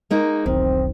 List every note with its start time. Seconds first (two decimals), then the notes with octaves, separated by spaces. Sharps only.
0.10 G#3 A#3 D#4
0.46 E1 B1 D#3 C4